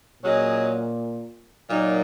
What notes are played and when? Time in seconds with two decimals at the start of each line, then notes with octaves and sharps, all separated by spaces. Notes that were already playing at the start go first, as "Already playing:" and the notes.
0.22 A#2 F#3 C#4 G#4 D#5
1.70 A#2 F#3 A#3 D#4